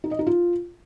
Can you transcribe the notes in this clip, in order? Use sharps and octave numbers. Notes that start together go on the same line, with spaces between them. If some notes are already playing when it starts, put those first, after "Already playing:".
D#4
D#5
D#4
F4